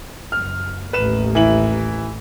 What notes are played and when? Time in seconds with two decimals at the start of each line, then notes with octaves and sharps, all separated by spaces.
0.32 F#1 F6
0.93 A1 D#2 B4 E7
1.35 E3 E4 F#7